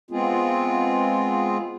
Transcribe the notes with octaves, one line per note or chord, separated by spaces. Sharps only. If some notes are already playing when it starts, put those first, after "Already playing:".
G#3 B3 C4 F4 G#4